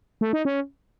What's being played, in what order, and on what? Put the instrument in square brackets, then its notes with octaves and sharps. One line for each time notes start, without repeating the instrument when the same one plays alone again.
[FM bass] A3
D#4
C#4